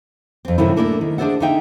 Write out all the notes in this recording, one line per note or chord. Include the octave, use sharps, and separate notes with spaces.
F2 C4
F#2 A2 C3 D#3 A3 E4
A3 A#3 D4 E4 F#4 A4
D#3
D4 G#4 C5 D5 E5 F#5
D3 A#3 D#4 E5 G5